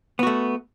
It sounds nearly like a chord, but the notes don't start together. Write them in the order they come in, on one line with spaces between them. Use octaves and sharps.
B3 F#4 A3